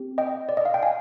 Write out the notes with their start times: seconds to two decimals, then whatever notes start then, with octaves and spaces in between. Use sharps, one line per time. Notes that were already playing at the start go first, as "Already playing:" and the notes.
Already playing: C4 G4
0.18 D#5 G5
0.49 D5
0.57 D#5
0.65 F5
0.74 G5
0.83 F5 G#5